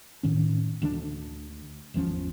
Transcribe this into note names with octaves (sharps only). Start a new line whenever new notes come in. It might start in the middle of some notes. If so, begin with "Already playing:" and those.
A2 D#3 C#4
D2 D3 B3 D4
G#1 E2 F3 C#4